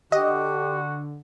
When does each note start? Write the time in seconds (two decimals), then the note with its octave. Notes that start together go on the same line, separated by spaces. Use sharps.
0.12 D3 F#4 G4 D#5